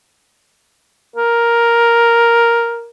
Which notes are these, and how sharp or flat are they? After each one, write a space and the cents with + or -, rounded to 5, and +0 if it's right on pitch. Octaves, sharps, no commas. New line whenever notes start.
A#4 +5